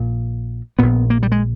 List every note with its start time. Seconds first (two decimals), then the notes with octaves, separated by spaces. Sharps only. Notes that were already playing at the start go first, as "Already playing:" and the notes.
Already playing: A#1 A#2
0.79 A#1 A#2 B3
1.10 A#3
1.23 G3
1.32 G#3